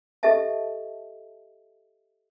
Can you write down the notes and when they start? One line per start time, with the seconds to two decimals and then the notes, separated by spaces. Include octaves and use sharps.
0.23 G4 A4 D#5 E5 A5